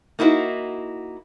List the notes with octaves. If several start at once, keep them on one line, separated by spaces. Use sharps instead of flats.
A#3 D#4 E4 F#4 C5